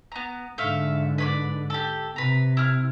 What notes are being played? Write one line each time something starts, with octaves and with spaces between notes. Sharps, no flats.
B3 A#5
G#2 D3 A3 E5 F5
B4 C#5 D5
G4 A4
C3 B4 A#5
E4 F6